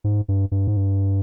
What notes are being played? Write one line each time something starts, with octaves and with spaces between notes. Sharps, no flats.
G#2
G2
G2
G#2
G2